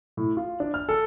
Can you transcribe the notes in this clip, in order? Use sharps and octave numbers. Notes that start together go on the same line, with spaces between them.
A2
F4
D4
F6
A4